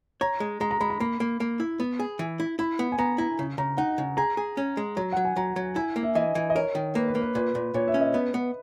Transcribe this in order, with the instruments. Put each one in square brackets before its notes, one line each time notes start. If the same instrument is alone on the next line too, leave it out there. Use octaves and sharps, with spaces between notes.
[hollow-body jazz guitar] C#5 [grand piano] A#5
[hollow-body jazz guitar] G#3
[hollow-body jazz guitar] G#3 [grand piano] A#5
[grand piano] A#5
[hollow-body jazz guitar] G#3 [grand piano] B5
[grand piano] A#5
[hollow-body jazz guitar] A#3 [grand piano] B5
[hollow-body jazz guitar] A#3
A#3
E4
B3
G#4
E3
E4
[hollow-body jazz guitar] E4 [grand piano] B5
[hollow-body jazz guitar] B3
[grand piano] G#5
[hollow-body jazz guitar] B3 [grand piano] A#5
[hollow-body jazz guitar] E4 [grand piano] A#5
[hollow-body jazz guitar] C#3
[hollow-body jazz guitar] C#3 [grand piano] A#5
[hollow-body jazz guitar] D#4 [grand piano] F#5
[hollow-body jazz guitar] C#3
[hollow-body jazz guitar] G#4 [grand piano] A#5
[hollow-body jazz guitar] G#4
C#4
G#3
[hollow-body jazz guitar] F#3 [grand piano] A#5
[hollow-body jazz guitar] F#3 [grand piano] F#5
[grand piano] G#5
[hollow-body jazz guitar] F#3 [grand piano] A#5
[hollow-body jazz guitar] F#3
[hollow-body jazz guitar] E4 [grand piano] G#5
[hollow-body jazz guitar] A#3
[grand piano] E5
[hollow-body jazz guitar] E3 [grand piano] D#5
[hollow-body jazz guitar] E3
[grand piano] D#5
[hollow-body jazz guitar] A#4 [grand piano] C#5
[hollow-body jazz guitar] D#3
[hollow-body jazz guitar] A#3 [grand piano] B4
[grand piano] B4
[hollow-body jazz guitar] A#3
[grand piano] B4
[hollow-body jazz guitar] A#2 [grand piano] B4
[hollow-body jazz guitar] A#2
[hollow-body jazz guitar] A#2 [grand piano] C#5
[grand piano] E5
[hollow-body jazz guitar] C#4
[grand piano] D#5
[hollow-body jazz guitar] B3 [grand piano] B4
[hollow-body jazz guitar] B3